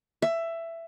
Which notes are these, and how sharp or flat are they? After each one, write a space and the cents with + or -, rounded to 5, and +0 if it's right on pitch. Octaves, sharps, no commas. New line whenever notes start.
E5 +15